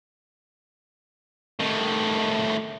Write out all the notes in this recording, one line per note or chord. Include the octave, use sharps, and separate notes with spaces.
A2 D#3